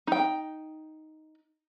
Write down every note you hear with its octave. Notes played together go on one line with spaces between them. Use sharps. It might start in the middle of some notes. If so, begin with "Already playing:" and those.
D#4 G5